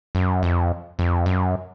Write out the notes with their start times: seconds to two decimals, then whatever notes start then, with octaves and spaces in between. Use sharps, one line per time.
0.15 F#2
0.43 F2
0.99 F2
1.26 F#2